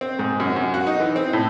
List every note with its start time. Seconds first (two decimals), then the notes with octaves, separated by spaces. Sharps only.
0.01 C4
0.19 G#2
0.40 F#2
0.56 F#2
0.74 F#4
0.87 D#4
1.00 E3
1.16 C4
1.33 A2